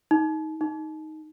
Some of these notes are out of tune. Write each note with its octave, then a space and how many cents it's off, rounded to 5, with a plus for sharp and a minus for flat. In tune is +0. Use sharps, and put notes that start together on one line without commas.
D#4 +20
D#4 +5